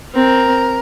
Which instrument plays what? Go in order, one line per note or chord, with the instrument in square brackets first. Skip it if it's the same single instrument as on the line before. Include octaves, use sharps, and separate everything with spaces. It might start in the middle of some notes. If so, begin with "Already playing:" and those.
[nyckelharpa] C4 [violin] A#4